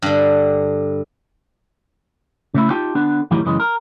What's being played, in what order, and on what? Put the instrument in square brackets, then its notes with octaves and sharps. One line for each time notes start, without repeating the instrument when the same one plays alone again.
[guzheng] G2 D3
[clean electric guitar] C#3 A3 E4
D#4 F4 G4 G5 A5
D3 B3 D4
F2 A2 D#3 E3 F#3 G3
F#2 C#3 E3 G#3
A#4